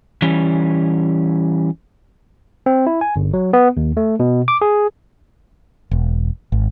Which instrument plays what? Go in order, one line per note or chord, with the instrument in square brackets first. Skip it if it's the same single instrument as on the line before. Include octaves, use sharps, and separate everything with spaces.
[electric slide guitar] E3 G3 C#4
[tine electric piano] C4
E4
G#5
G1
F#3
B3
D#2
A3
B2
D6
G#4
[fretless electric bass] E1
G#1